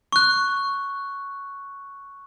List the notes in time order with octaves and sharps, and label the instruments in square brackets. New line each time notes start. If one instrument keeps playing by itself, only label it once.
[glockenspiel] C#6 F#6